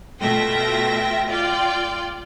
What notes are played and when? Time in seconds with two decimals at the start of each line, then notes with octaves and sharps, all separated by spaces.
0.21 B2 A3 F4 E5 G5 A#6
1.29 F4 D5 G5